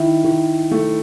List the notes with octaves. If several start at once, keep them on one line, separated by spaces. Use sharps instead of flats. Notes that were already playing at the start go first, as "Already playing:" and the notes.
Already playing: D#3 E4
D#3
A3